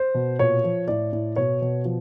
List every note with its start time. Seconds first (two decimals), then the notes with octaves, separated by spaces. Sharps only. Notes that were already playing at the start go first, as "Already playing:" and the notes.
Already playing: C5
0.14 B2
0.39 A#2 C#5
0.64 F3
0.88 A2 D5
1.13 A2
1.36 B2 C#5
1.62 B2
1.85 F3